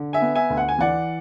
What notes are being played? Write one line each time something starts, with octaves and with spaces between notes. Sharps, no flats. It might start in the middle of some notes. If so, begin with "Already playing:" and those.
Already playing: D3
E5 G#5
B3
E5 G#5
D2
F#5
G#5
E3 D5 F#5